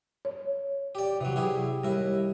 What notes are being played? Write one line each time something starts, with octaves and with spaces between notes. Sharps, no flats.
C#5
G4 D5
C3 E3 F#3
E4 G4 G#4
D#2 G3 E4